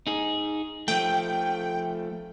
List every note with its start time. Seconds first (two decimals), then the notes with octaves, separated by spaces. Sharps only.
0.07 D#4 G#4
0.88 F3 A3 G5